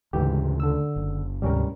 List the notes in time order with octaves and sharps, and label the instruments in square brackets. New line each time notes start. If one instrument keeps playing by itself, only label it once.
[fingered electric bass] D2 C#3 [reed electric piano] G#2 E3 G4
[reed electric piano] D3 E6
[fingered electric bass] F#1
[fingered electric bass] D2 G#2 C3 [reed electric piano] G3 C#4 A#4